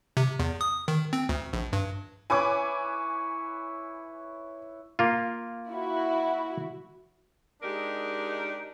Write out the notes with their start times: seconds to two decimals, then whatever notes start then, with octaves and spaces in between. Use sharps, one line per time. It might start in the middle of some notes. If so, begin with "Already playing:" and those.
0.17 C3
0.40 E2
0.61 D#6
0.88 D#3
1.13 C4
1.29 D2
1.53 A#1
1.73 G2
2.30 E4 B4 C#5 G#5 D6
4.99 A#3 F4
5.70 E4 F#4
7.62 G#3 D4 D#4 G4 A#4